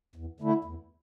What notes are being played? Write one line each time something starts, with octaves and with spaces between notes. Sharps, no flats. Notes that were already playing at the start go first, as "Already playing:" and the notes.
E2
D3 A3 E4
E2